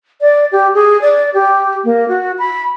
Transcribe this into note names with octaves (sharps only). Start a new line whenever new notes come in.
D5
G4
G#4
D5
G4
A#3
F#4
B5